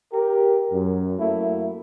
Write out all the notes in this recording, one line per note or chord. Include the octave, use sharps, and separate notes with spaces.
G4 A#4
F#2
F#3 A3 A#3 E4